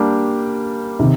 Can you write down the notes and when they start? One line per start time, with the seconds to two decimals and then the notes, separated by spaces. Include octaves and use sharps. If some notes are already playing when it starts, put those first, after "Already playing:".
Already playing: G3 A#3 D4 G4
0.99 C3 D#3